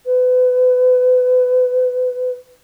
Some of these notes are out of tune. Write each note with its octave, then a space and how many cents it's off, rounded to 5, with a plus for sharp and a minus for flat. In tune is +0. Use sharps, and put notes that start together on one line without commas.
B4 +30